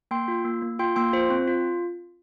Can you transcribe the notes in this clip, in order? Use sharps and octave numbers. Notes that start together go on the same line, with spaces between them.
A#3 G5 C6
F4
A#3
A#3
F4 G5 C6
A#3 G5 C6
F4 C5
C4
F4